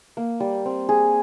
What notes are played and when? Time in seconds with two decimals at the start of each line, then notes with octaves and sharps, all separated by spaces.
0.17 A#3
0.40 G3
0.66 C4
0.89 G#4